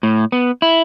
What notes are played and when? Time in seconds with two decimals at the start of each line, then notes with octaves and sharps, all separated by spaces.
0.03 A2
0.32 B3
0.62 E4